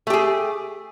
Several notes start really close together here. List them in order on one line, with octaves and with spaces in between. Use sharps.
A3 G4 G#4